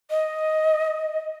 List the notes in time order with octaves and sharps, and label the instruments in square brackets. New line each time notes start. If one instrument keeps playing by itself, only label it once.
[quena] D#5